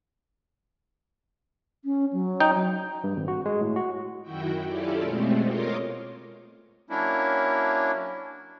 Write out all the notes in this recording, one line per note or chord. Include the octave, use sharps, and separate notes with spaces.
C#4
F#3
D#4 G5
G2
G#1
F#4
G#3
A2
F#4
F#2 D#3 E4 F#4 G5
C#4 E4 F4 G4 A4 D5
B2 G#3 A3 C4
F4 A#4 C#5 D#5 C6 D6
F#3 A#3 C#4 D4 E4